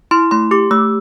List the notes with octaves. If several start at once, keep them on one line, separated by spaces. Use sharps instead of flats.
E4 C6
A3 C6
G4 D6
A3 E6